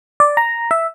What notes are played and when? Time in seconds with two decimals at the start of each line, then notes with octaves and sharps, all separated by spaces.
0.20 D5
0.37 A#5
0.71 E5